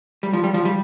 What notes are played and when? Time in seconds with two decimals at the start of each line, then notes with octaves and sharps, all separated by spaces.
0.23 G3
0.33 F3
0.44 G3
0.54 F3
0.65 G3